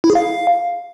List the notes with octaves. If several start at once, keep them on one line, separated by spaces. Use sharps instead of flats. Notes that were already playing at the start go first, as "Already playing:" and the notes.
E4
G#4
F5